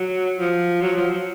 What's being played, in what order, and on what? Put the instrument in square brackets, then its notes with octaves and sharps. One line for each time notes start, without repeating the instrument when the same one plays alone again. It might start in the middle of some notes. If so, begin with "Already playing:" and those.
Already playing: [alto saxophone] F#3
F3
F#3
F3
F#3